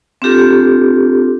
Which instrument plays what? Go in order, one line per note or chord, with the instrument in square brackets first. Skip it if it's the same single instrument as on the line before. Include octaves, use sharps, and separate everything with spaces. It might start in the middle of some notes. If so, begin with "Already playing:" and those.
[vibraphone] C4 D4 F4 G4 A4